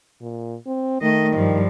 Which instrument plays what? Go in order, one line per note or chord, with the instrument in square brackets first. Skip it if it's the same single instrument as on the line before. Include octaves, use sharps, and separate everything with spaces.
[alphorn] A#2
C4
[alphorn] D#3 [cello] A3 D#5
[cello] G2 F3